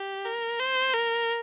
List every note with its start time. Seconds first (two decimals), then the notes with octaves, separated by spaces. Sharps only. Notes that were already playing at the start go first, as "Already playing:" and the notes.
Already playing: G4
0.25 A#4
0.59 C5
0.94 A#4